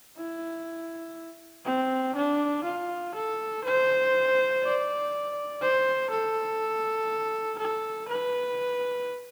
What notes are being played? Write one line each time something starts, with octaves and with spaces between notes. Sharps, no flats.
E4
C4
D4
F4
A4
C5
D5
C5
A4
A4
B4